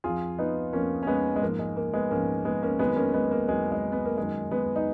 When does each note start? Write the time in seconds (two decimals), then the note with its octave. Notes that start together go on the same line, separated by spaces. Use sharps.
0.04 F2 F3 F4 G#4
0.39 B3 D#4
0.73 F2 F3 A#3 C#4
1.03 C#4
1.07 G#3 B3
1.36 G#3
1.42 G#2 F3 A#3
1.59 G#3
1.76 A#3
1.93 G#3 B3
2.11 G#2 F3 A#3 C#4
2.45 G#3 B3
2.62 A#3 C#4
2.79 F2 D#3 F#3 G#3 B3
2.96 A#3 C#4
3.14 G#3 B3
3.31 A#3
3.48 F2 D#3 F#3 G#3
3.72 G#3
3.92 B3
4.05 A#3
4.17 F#2 D#3 F#3 G#3
4.51 G#3 B3
4.76 D#4